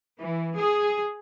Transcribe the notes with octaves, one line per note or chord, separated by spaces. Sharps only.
E3
G#4